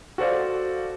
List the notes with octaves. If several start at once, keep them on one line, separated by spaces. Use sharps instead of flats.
F#4 A4 C5 D5 F5